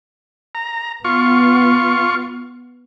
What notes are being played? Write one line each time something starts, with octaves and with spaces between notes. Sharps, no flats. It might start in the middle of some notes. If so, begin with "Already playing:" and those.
A#5
B3 F4 C#6